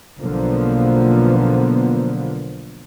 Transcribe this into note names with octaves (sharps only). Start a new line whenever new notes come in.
B1 D3 F3 A#3 B3